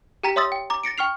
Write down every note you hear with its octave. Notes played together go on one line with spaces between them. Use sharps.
G4 G5 A#5 B6 D#7
C#5 E5 C6 D#6 E6 A6
G5
A#5 D6
A6 A#6 C#7 D7
G5 C#6 F6 C7 F7